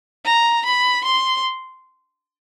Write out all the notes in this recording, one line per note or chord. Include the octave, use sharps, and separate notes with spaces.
A#5
B5
C6